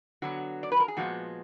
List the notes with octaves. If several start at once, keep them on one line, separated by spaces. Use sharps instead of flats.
D3 F#3 B3 F#4
D5
B4
A#4
G#4
A#2 F3 G#3 B3 F#4